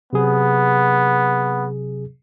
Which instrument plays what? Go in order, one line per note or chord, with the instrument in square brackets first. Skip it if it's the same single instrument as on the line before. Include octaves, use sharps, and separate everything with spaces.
[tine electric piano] C3 F#3 G#4 [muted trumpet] B3